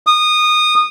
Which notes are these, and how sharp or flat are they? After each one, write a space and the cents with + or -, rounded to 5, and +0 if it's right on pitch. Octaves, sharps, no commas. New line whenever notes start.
D#6 -20